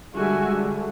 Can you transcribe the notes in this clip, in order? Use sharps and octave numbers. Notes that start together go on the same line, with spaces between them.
D3 G3 G#3 F#4 E5 G#5
D3